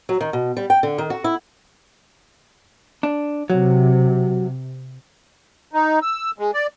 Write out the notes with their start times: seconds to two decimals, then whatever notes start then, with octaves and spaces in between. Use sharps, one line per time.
0.09 F#3
0.21 D#3
0.33 B2
0.57 G3
0.70 G5
0.83 D3
0.98 D#3
1.10 F#4
1.24 E4
3.03 D4
3.50 C3 F#3
5.74 D#4
6.02 E6
6.39 G#3
6.54 D5